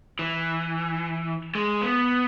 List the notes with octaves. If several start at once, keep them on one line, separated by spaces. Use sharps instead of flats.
E3
G#3
B3